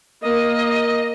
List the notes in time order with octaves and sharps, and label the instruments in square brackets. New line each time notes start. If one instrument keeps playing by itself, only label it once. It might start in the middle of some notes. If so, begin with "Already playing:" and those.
[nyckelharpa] A#3 [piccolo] D#5